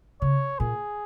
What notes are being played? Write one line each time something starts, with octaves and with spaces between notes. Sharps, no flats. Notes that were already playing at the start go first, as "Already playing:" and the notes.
C#3 C#5
A#2 G#4